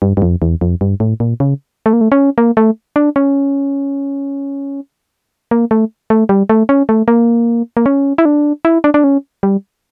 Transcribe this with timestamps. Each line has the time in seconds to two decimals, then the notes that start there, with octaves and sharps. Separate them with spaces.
0.02 G2
0.17 G2
0.22 F2
0.42 E2
0.61 F2
0.81 G2
1.00 A2
1.20 A#2
1.40 C#3
1.86 A3
1.93 A#3
2.01 A3
2.12 C#4
2.38 A#3
2.57 A3
2.96 D4
3.16 C#4
5.51 A#3
5.71 A3
6.10 A3
6.29 G3
6.49 A3
6.69 C#4
6.89 A3
7.08 A#3
7.77 A#3
7.86 C#4
8.18 E4
8.25 D4
8.65 E4
8.84 D4
8.94 D4
9.04 C#4
9.43 G3